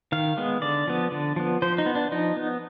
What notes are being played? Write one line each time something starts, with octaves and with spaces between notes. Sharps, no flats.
D#3 F5
G#3 B3
D3 D5
F3 B3
D3
F3 B3
F3 C5
D#4
B3
D4
F3 D#4
B3